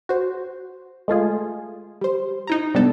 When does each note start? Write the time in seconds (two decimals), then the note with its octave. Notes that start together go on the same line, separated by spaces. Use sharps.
0.09 F#4 C5
1.08 G#3 A3 F4 G#4
2.01 G3 C5
2.47 D#4 E4 A#5
2.74 C3 G3 G#3 B3 D4 A4